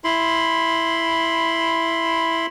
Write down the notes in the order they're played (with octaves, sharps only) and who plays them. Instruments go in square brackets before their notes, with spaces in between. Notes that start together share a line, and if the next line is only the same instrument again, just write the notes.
[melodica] E4 B5 C6